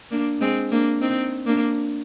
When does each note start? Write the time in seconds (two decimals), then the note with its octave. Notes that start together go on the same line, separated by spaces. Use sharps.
0.11 A#3 D4
0.41 G#3 C4
0.72 A#3 D4
1.01 C4 D#4
1.46 A#3 D4